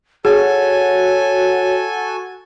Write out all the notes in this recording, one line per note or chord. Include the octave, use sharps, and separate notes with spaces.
F#4 G#4 A4 C#5 G#5